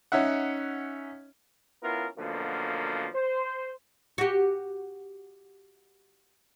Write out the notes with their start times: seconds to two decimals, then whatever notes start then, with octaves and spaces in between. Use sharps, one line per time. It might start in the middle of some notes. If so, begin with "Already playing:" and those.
0.12 C#4 D#4 E5 F#5
1.83 B3 C#4 E4 F4 A#4
2.18 F#2 B2 D3 F3 A#3
3.15 C5
4.18 F#4 G4